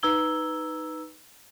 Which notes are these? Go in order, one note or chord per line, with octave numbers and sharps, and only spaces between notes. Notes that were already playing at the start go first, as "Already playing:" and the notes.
D#4 B4 A#5 E6 G#6 G7